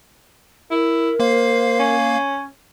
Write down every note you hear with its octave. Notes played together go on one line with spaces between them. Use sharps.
E4 A#4
A#3 C5 F5
C#4